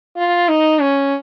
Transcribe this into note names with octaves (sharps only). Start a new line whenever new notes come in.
F4
D#4
C#4